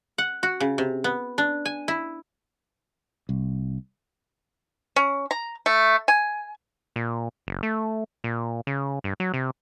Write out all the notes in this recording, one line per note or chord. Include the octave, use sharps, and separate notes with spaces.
F#5
F#4
C#3
C3
B3
D4
G#5
E4
C2
C#4
A#5
A3
G#5
A#2
F#1
A3
A#2
C#3
G2
F#3
C3